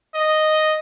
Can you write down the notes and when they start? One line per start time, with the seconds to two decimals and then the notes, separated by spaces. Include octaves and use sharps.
0.15 D#5